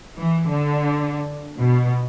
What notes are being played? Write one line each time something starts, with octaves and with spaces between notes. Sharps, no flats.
E3
D3
B2